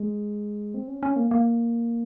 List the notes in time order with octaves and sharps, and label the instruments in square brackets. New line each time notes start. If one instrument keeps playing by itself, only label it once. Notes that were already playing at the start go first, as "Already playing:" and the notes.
Already playing: [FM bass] G#3
C4
C#4
C#4
A#3
A#3